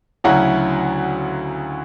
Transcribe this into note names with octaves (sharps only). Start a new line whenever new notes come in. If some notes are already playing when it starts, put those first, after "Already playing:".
D2 C#3 F#3 C#4 E4 F#5 A#5